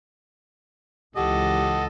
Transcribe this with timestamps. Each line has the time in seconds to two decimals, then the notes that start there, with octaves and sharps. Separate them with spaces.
1.16 C#2 E3 G4 A4 D#5 F#5